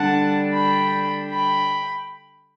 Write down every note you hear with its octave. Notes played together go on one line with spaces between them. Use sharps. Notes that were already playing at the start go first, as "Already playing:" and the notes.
Already playing: D3 G3 D4 F#5 A5
G5 B5
G5 B5